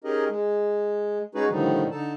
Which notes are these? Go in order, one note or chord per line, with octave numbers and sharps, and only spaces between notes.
C#4 D#4 G4 G#4 A#4 D#5
G#3
G#3 C#4 D#4 F#4 G#4 B4
A2 D3 D#3 F3 G3 D#4
D3 D#4 A4 A5